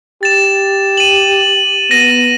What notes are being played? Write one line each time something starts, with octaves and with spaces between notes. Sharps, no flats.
G4 A6 E7
D#7 F#7
B3 A#6 D#7